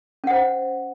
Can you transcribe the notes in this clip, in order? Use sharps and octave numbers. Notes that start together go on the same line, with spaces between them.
C#4 C5 F#5